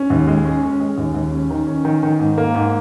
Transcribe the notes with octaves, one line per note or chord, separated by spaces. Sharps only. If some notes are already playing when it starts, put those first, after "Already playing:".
Already playing: C#4
D#2
G#3
C#4
C#4
G#3
D#2
D#2
C#4
D#3
C#4
D#3
D#3
G#2
A#3
G#2